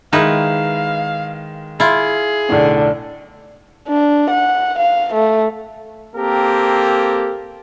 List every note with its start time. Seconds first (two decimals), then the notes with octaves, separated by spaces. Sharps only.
0.13 D#3 G#3 D#4 E4 B4 F5
1.80 E4 F4 G#4
2.50 B1 A2 D3
3.88 D4
4.30 F#5
4.78 F5
5.14 A3
6.15 A#3 C4 G4 A4 A#4